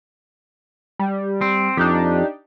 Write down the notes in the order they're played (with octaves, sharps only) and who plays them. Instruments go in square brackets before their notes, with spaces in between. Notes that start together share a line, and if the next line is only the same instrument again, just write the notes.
[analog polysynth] G3
[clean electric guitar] C4
[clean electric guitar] F2 [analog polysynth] D4 D#4 G4